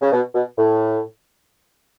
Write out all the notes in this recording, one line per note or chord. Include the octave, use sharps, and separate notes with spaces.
C#3
B2
B2
A2